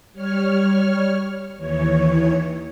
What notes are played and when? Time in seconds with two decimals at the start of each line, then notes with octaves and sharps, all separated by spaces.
0.13 G3 C#5 F6
1.57 D#2 E3 C#5